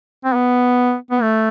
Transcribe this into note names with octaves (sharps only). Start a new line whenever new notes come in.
C4
B3
B3
A3